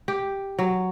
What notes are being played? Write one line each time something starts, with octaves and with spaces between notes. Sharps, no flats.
G4
F#3